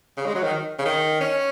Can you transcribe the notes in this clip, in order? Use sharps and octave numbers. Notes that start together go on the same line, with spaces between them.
C#3
G#3
F#3
D#3
C#3
D#3
C#4